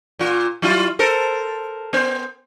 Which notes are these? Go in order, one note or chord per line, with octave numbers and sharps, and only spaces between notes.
A#2 F4
F#3 E4 F4
A4 A#4 C5
B3 C5